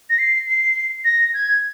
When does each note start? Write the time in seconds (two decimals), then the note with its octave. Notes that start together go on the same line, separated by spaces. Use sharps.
0.10 A#6
0.19 C7
0.48 C7
1.05 A#6
1.34 G#6